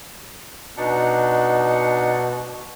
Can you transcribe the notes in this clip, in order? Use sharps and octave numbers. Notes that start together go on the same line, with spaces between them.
B2 D4 D#4 F#5